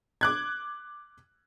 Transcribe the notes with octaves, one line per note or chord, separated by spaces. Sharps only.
D6 F#6 G#6